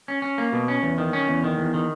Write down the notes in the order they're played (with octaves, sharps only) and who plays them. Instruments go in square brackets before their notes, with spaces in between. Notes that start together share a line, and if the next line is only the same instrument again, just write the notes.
[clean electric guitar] C#4
C#4
A#3
B2
C#4
E2
D#3
C#4
E2
D#3
E2
D#3